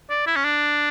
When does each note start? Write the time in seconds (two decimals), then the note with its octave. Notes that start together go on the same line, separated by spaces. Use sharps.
0.10 D5
0.27 E4
0.36 C#4
0.44 D4